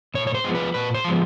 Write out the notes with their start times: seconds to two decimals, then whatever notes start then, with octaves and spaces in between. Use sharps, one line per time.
0.14 A#2 C#5
0.27 C#5
0.35 C5
0.44 F3 G#3 B3
0.55 B4
0.74 A#2 B4
0.94 C5
1.05 F3 G#3 B3